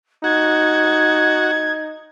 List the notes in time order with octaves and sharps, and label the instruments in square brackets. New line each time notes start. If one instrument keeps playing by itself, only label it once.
[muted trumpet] D#4 [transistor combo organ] F#4 [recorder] G#6